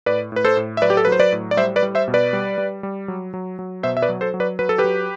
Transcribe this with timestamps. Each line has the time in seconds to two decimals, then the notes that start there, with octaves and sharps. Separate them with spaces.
0.06 A2 B4 D5
0.32 A2 B4
0.45 A4 C5
0.57 A2
0.77 E5
0.82 F#3 B4 D5
0.90 G4
0.97 A4
1.05 F#3 B4
1.12 C5
1.20 B4 D5
1.32 A2
1.51 D5
1.57 G3 C5 E5
1.76 B4 D5
1.83 G3
1.95 C5 E5
2.08 B2
2.14 B4 D5
2.33 G3
2.58 G3
2.83 G3
3.08 F#3
3.34 F#3
3.59 F#3
3.83 B2 C5 E5
3.97 E5
4.02 B4 D5
4.09 F#3
4.21 A4 C5
4.34 F#3
4.40 B4 D5
4.59 F#3 B4
4.69 A4
4.78 G4 B4
4.84 F#3